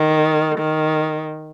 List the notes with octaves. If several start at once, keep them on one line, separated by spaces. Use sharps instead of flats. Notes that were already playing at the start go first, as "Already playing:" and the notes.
Already playing: D#3
D#3